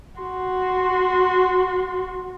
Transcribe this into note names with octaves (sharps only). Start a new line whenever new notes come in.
F#4 C6